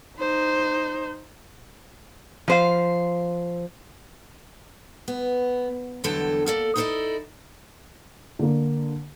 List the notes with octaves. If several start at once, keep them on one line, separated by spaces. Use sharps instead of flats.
D#4 C5
F3 C5 F5
B3
E2 G2 D3 F#3 A4 G5
A#3 A4 D5
D#4 E4 A4 B4 D5 D#5
D3 A#3